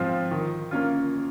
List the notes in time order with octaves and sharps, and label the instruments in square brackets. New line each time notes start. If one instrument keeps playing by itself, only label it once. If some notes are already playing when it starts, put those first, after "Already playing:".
Already playing: [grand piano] G#2 F3 C4 F4
D#3
A#3 C#4 F4